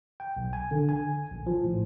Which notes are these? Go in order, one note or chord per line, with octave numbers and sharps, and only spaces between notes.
G5
B1
G#5
D3
G#5
A#1
F3
A2